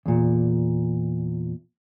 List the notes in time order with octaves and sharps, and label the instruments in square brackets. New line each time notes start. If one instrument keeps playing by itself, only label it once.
[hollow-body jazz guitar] E2 A#2